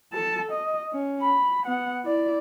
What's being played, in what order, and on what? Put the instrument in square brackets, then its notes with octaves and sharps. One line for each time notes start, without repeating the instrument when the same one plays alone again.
[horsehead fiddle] A4 A5
D#5
C#4
B5
B3 F#5
E4 D5